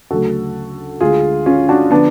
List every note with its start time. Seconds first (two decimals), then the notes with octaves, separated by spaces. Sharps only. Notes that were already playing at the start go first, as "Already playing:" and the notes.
0.11 D2 C#3 F#3 A3 F#4 A4
1.01 D2 D3 G#3 F4 G#4
1.46 C#4 F4
1.69 D4 F#4
1.91 D3 F3 B3 D4